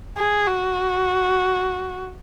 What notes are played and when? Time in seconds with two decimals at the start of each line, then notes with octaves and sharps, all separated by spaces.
0.18 G#4
0.47 F#4